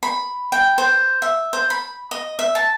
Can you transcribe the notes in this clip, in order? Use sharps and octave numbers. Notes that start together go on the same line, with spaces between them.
B5
G5
C5
E5
C5
B5
D#5
E5
A5